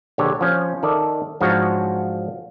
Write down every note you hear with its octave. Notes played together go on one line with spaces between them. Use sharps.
A#1 D3 G4 C#5
F3 C#4
D#3 A4 D5 E5 A5
G#2 F3 F#3 D4 F#4 C#5